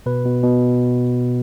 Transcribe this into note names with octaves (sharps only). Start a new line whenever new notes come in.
B2 B4
B2
B2